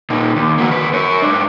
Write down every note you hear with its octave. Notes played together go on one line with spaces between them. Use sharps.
A#2 D#4
D#2
A#3 F#4
D#2 B4
A#4 C#5
G#2 D4